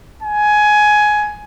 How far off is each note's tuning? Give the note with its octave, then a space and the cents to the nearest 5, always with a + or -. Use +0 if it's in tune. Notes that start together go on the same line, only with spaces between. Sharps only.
G#5 +15